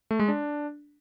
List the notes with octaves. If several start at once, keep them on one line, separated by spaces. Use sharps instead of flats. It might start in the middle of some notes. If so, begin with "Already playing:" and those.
A3
G#3
D4